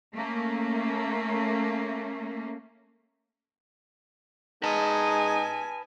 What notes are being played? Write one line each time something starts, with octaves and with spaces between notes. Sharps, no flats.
A3 A#3 C#4
G#3 D#4 B4 G#5 A5